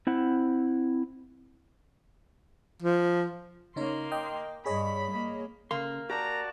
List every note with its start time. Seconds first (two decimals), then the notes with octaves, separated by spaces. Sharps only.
0.07 C4 E4 F#5
2.82 F3
3.76 C#3 A#3 D#4 C#5 C6
4.12 D#5 G5 D6
4.66 G2 G#4 C#5 D#5 B5
5.11 A#3
5.71 C#3 A#3 C6
6.10 F#4 G4 A#4 D5 A5 A#5